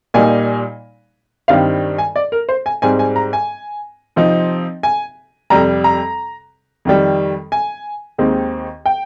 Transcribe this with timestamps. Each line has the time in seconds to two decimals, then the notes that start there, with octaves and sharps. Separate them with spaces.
0.14 A#2 G3 A#3 D#4 G#5
1.48 G2 D#3 G3 C4 D#4 F5
1.98 G#5
2.16 D5
2.32 A#4
2.49 C5
2.66 G#5
2.82 G#2 G3 C4 G#5
2.99 G#5
3.16 A#5
3.33 G#5
4.16 C3 F3 C4 D#4
4.83 G#5
5.50 F2 C3 G3 A#5
5.84 A#5
6.85 F2 D#3 G3
7.52 G#5
8.18 D#2 D#3 G#3 C4 D#4
8.86 G5